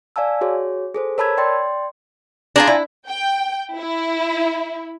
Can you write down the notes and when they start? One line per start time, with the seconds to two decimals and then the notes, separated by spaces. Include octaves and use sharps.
0.16 D5 F5 G#5 A5 E6
0.41 F#4 G#4 C#5
0.95 G#4 A4 C5
1.18 A#4 C#5 A5 B5 E6 G#6
1.37 D5 G5 C6 A6
2.56 D4 F4 G#4 G#5 A#5
2.67 E4
3.07 G5
3.75 E4